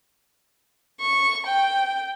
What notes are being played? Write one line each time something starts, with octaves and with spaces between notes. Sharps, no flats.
C#6
G5